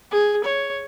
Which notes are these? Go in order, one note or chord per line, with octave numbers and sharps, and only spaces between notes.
G#4
C#5